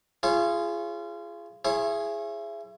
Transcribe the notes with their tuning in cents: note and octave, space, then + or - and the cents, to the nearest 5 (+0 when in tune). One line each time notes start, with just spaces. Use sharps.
F4 -30 G#4 +0 C#5 -35
E4 +30 G#4 +0 C#5 -35